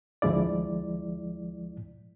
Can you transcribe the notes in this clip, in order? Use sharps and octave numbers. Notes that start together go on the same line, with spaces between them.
D2 F3 G#3 E4 D5